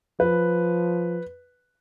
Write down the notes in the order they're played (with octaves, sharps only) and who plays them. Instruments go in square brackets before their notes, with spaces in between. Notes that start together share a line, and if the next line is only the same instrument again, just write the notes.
[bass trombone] F3 [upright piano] B4